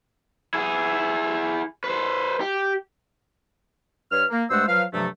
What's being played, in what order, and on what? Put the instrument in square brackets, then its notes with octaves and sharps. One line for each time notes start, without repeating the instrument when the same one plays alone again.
[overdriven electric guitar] E4 G#4
B4 C5
G4
[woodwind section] G2 B4 C#5 F6
A#3
G2 G#3 A3 C5 F#5 E6
F3 F#3 B4 F5
G2 C3 F3 F#3 A3